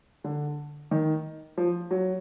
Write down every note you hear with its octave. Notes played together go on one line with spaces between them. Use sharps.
D3
D#3
F3
F#3